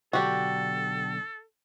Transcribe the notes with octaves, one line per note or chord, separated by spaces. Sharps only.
B1 D3 D4 F#4 G4 A4